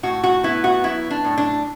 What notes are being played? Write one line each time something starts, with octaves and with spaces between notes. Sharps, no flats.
A2 F#4
F#4
B3 E4
F#4
F#3 E4
D4
A2
D4